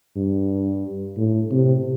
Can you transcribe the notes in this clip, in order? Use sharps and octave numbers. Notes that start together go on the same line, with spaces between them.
G2
A2
C3